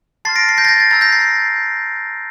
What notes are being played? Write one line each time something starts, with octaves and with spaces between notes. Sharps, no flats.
A5 C6 F6 A6 C7
A#6 D7
C7
G6 A#6
A6
G6 A#6
A6
A#5 E6 G6 A6
G6 A#6
A6 C7